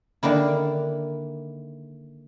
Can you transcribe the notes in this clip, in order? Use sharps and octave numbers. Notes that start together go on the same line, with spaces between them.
D3 D#3 A#3 E4